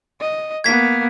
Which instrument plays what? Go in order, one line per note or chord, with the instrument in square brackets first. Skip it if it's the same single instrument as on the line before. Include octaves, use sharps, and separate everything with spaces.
[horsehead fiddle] D#5
[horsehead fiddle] A#3 B3 [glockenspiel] G#6 B6